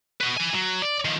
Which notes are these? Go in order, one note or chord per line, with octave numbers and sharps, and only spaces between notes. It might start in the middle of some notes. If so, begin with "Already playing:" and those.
F#4 B4
B4 G#5
F#3
D5
D#3 F3